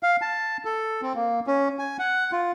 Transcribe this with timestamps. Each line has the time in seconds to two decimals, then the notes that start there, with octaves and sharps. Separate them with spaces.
0.03 F5
0.22 A5
0.65 A4
1.02 C4
1.15 A#3
1.47 C#4
1.79 G#5
1.99 F#5
2.32 F4